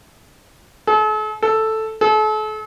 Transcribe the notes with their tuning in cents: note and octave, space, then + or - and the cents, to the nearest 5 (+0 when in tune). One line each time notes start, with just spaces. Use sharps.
A4 -45
A4 +0
A4 -40